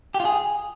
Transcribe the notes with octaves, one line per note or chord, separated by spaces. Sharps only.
G4
F4
G#4